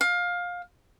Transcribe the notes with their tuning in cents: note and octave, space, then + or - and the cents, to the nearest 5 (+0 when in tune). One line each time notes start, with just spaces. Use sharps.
F5 +20